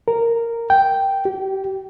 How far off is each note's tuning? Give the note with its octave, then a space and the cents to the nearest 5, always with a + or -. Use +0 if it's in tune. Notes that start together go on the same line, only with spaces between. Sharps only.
A#4 -10
G5 -5
G4 -30